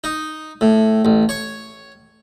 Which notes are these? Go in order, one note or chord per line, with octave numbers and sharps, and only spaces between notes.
D#4
A2
A1
C#5